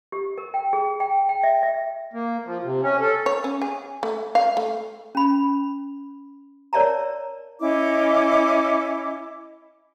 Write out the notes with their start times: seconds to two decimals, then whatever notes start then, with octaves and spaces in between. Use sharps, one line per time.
0.12 G4
0.38 A#4
0.54 G5
0.73 G#4
1.00 G5
1.29 G5
1.43 E5
1.63 E5
2.13 A#3
2.45 F3
2.63 C3
2.83 C#4
3.00 A4
3.26 C#5
3.44 C#4
3.62 G#4
4.03 A3
4.35 F5
4.57 A3
5.15 C#4 B5
6.73 A#4 C#5 D5 E5 A5 A#5
7.60 C#4 E4 D#5 D6